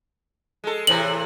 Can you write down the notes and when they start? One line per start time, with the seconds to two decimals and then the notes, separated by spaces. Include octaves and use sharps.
0.64 G#3 A4
0.87 A2 C3 E3 F#7